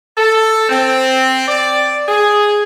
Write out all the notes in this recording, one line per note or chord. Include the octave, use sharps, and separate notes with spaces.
A4
C4
D5
G#4